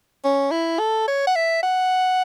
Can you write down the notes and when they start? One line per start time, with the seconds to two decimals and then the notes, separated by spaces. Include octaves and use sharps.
0.24 C#4
0.51 E4
0.79 A4
1.08 C#5
1.27 F#5
1.36 E5
1.63 F#5